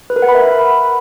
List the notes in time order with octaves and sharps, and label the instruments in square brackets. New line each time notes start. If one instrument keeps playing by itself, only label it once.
[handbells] B4
A#4
F#5
B5
E5